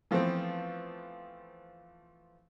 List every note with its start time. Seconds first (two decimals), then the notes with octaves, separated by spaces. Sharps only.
0.11 E3 F3 A3 B3 C4